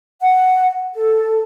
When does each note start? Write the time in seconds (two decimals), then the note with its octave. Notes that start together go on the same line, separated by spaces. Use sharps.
0.22 F#5
0.94 A4